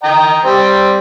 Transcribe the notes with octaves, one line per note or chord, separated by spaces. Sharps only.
D#5 G5 A#5
G3 C4